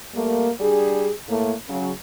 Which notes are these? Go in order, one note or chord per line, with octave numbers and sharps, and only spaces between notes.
G3 A3 A#3
G3 D4 G#4
A2 A3 A#3
C#3 F#3